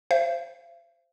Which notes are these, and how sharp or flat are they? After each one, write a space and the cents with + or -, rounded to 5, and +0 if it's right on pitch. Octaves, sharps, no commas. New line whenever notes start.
C5 +0 F5 -45